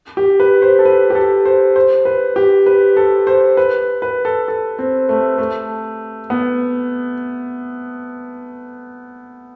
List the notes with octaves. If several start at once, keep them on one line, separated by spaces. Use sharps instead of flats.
G4
B4
C5
A4
B4
G4
A4
C5
C5
B4
G4
B4
A4
C5
B4
B4
A4
A4
C4
A3
A3
B3